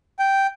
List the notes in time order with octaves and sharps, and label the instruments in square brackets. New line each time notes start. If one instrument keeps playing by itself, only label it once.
[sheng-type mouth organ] G5